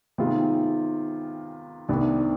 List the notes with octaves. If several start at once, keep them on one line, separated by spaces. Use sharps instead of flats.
C3 D#3 G#3 B3 F4
C2 C3 D#3 B3 D4